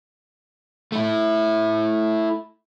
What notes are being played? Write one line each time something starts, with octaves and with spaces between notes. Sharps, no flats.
A3 E4